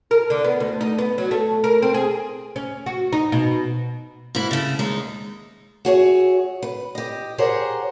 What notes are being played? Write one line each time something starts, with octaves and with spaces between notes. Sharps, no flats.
A#4
D3
B3
D2
D#4
B3
F#3
A3
A#4
C4
G#4
C#4
F#4
D#4
B2
G#2 E4
C#3 A3
D#2 G#3 D#4
F#4 G#4 C#5 E5
B4
G4 D#5
G4 G#4 A#4 C5 C#5 F#5